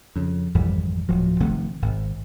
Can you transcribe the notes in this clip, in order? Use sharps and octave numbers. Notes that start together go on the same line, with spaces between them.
F2 C#3
G#1 F2 E3 G3
D1 F3 F#3
F1 C3 D#3 A3
G#1